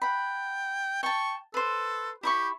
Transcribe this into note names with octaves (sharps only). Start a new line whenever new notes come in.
F#5 G5 B5
G5 A5 C#6
A4 B4 C5
E4 G4 B5 C#6